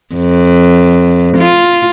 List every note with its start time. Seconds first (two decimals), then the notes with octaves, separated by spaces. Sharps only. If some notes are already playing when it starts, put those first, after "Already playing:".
0.16 F2
1.38 F4